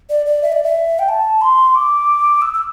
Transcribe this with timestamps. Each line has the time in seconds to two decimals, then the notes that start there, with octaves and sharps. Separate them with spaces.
0.10 D5
0.26 D5
0.43 E5
0.52 D5
0.64 E5
0.99 G5
1.09 A5
1.41 C6
1.75 D6
2.42 E6
2.54 E6